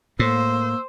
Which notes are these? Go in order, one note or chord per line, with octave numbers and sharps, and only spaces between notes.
A2 A#3 C5 E6